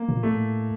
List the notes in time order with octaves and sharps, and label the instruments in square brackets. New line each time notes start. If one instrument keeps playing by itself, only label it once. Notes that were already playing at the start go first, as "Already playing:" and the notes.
Already playing: [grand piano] A#3
[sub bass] A#2
[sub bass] A2 [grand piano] A3